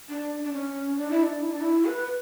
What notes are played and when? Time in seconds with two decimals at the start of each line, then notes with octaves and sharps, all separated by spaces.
0.09 D4
0.43 D4
0.53 C#4
0.97 D4
1.11 E4
1.23 D4
1.42 E4
1.51 D4
1.61 E4
1.86 B4